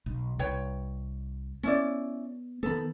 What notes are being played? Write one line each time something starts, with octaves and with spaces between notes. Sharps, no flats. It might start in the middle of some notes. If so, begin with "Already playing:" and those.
B1
C2 B4 C#5 G5
B3 C#4 E4 D5
D#3 B3 A4 B5